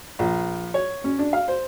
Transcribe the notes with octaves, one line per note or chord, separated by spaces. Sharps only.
A#1
C#5
C#4
D4
F5
C5